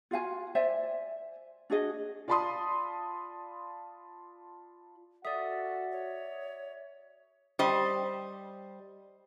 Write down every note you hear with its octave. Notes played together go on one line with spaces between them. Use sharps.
F4 F#4 F5 G#5
C5 D5 E5 G#5
D4 F#4 G#4 D#5
F4 D5 A5 B5 C6 D#6
F#4 A4 D5 E5 F#5 D#6
C#5
G3 C5 D#5